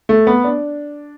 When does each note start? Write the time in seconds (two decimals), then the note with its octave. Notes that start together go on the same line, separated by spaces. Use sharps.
0.09 A3
0.27 B3
0.44 D4